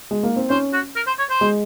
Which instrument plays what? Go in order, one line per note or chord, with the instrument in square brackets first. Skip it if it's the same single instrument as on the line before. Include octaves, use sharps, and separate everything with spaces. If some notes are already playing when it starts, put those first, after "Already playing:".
[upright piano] G#3
A#3
C4
[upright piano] C#4 [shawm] C5
[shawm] F#4
A#4
C5
C#5
C5
[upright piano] G#3